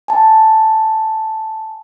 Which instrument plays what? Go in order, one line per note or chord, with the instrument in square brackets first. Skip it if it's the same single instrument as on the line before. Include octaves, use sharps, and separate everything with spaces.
[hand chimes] G#5 A5